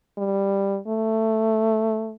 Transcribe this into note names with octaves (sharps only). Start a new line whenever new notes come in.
G3
A3